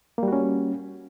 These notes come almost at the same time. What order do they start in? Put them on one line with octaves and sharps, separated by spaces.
A#3 G3 F#4 C#4